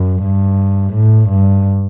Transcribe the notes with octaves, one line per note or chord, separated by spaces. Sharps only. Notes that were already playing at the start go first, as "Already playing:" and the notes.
Already playing: F#2
G2
A2
G2